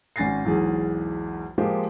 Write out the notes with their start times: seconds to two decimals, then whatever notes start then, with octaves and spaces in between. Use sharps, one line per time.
0.16 G#1 C#4 G#5 A6 A#6 C7
0.45 B1 E2 G#2 G#4
1.58 F3 G#3 A#3 F4 G4 C5